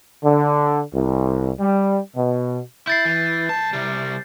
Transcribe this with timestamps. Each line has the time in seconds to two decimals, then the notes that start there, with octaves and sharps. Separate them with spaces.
0.23 D3
0.94 C2
1.60 G3
2.16 B2
2.87 E4 G6 A6 C7
3.05 E3
3.49 C2 A5
3.73 C3 G3